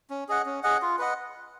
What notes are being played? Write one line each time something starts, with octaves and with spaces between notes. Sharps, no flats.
C#4
G#4 D#5 F#5
C#4
G#4 D#5 F#5
F4
B4 D#5 F#5